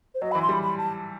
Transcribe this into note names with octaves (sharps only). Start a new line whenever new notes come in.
C5
F#3 D#5
E3 B5
C6
G3 B5
B5
A5